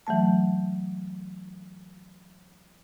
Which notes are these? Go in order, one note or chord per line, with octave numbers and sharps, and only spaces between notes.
E3 F#3 A3 A5